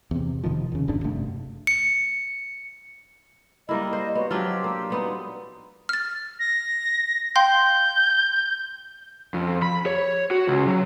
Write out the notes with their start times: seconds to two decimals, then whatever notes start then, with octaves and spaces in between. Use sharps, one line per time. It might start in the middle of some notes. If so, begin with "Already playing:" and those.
0.11 E2 C3
0.44 F1 C3 D#3 F3
0.72 D#2 C#3
0.88 D#1 G#1 F2 D4
1.04 F#1 G2 C3 A3
1.67 C#7
3.69 G3 A#3 E4 D#5
3.93 C5
4.15 B3 F#4 C#5 D#5
4.31 F#3 D4 F4 G4 C5 E6
4.64 A#3
4.90 G3 B3 D#4 C6
5.89 F6 A6
6.39 A#6
7.36 F5 G5 C6 G6
9.34 F2
9.62 B5
9.86 C#5
10.31 F#4
10.48 C#2
10.68 F#3